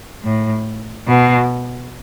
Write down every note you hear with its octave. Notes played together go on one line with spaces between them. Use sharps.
A2
B2